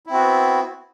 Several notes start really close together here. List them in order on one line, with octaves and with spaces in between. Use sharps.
E4 C4 F#4 B3